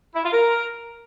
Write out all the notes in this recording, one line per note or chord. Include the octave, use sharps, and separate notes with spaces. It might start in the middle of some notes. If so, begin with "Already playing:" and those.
E4
F4
A#4